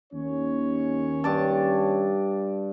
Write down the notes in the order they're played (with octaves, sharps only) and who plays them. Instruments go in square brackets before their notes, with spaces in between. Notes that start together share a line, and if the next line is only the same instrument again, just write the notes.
[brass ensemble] D#2 C#4 C#5
[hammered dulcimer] G2 D5 A5